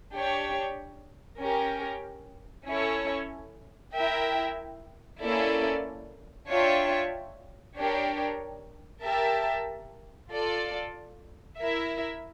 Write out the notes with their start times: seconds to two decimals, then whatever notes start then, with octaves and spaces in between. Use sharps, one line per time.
0.12 D4 G4 C#5
1.39 C#4 G4 A#4
2.66 C#4 E4 A4 C#5
3.93 E4 A#4 E5 G5
5.21 A#3 C#4 E4 A4 D5
6.49 D4 F4 C#5 E5 G5
7.76 D4 G4 A#4 C#5
9.03 G4 A#4 E5 A5
10.30 F4 A4 D5
11.57 E4 A#4 E5